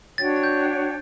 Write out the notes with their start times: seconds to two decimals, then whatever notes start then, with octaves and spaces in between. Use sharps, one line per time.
0.18 D4 F#4 C#5 G5 A6
0.36 A6
0.44 G6